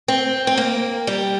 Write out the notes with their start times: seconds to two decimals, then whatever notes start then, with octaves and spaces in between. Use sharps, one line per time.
0.08 C4
0.47 C4
0.57 A#3
1.07 G3